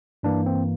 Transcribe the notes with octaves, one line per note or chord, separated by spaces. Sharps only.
G2 E3 A#3 D4
C4